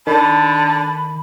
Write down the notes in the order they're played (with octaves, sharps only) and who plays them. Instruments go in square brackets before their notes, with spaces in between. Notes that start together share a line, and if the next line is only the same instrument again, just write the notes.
[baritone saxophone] D3 [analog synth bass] D#3 [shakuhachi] A5 [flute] B5